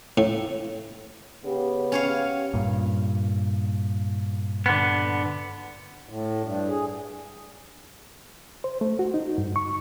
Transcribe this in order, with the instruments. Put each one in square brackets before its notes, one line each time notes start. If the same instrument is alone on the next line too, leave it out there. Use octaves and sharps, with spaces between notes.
[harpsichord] A2
[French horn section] C#3 B3 G4
[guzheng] C#4 C#5 F5
[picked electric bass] G2 A#2
[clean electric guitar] D3 B3
[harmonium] A2
G2
G#4
[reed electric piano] C5
A3
F#4
D#4
G2
C#6